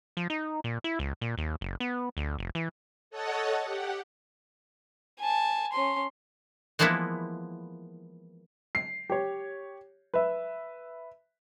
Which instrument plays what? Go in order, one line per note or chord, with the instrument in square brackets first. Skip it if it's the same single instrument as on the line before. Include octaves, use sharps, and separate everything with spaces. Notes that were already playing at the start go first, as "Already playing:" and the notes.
[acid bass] F3
D#4
A#2
E4
C#2
A#2
D#2
F#1
B3
D2
F1
E3
[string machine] A4 C#5 D#5 F#5 A5
G4 F#5
[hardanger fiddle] G#5 A5
C#4 C6
[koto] E3 F3 G#3 A#3 B3 E4
[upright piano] C7
G4 C#5
B4 E5